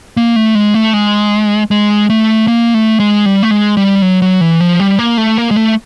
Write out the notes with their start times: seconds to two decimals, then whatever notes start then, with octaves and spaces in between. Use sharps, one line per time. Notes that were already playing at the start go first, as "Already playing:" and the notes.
0.17 A#3
0.36 A3
0.55 G#3
0.74 A3
0.93 G#3
1.71 G#3
2.10 A3
2.48 A#3
2.74 A3
3.00 G#3
3.26 G3
3.43 A3
3.51 G#3
3.77 G3
4.02 F#3
4.22 F#3
4.41 E3
4.60 F3
4.80 G3
4.99 A#3
5.17 A3
5.38 A#3
5.51 G#3
5.56 A3